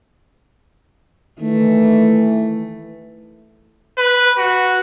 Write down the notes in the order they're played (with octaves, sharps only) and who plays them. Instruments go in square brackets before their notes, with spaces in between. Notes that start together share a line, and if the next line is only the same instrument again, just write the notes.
[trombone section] D#3 E3 [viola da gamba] A3
[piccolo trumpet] B4
F#4